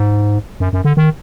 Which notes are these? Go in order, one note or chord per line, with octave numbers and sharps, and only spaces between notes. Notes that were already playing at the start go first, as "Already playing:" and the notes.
Already playing: G#2
F#2
F#2
D3
D#3